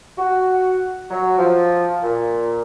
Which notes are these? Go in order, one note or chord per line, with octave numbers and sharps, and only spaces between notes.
F#4
F#3
F3
A#2